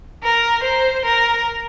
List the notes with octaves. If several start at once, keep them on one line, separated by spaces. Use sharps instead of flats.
A#4
C5
A#4